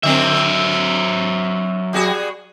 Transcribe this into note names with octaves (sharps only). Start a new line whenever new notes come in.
D3 F#3 C4 E5
G3 F#4 G#4